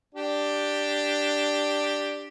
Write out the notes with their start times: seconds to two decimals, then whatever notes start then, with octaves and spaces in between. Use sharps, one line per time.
0.15 D4 G4